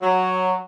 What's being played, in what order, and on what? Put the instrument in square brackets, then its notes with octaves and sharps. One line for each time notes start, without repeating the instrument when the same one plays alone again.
[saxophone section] F#3